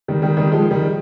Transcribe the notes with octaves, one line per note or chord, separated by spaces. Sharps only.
D#3 G3
D#3 G3
D#3 G3
F3 G#3
D#3 G3